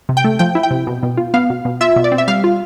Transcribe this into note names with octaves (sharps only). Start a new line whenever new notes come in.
C3
G5
A3
F3 G5
E4
G5
C3
B2
B2
F4
B3 F5
B2
B2
F4 E5
B2
D5
C4
E5
G3 F5
F4